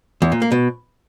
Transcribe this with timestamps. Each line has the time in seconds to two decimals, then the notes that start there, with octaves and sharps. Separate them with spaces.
0.22 E2
0.32 A#2
0.42 A#3
0.52 B2